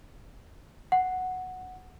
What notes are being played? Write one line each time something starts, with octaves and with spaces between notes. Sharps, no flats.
F#5